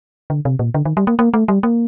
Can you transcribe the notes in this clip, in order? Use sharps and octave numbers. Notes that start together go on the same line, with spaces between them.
D3
C3
A#2
D3
D#3
G3
A#3
A#3
A3
G3
A#3